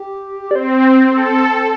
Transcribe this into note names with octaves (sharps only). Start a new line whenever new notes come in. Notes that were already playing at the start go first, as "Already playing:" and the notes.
Already playing: G4
D5
C4 C5
A4